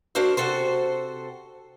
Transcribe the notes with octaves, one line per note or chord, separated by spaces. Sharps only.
D4 F#4 A#4 C5 E5
C3 F#4 A4 C5